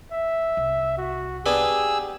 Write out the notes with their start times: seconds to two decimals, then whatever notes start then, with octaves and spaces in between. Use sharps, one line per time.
0.13 E5
0.57 C2
0.98 F#4
1.46 B3 D4 G4 G#4 B4 E6